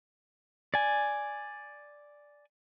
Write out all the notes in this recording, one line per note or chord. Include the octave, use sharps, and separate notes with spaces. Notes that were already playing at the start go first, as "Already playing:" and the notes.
D5 G#5